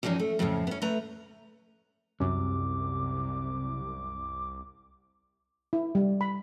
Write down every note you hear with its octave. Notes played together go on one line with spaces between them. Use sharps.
E2 G2 F3 C#4 D#4
A3
F2 A2 C#3 E3 F3
B3 C#4
A3 B4 A#5
C2 F#2 C3 D6
E4
G3
B5